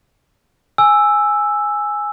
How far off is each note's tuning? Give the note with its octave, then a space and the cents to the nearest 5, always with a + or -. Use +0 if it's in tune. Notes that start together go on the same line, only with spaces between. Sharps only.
G#5 +0 E6 +0